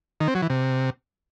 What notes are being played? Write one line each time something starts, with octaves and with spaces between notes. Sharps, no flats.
D#3
C4
F#3
E3
C3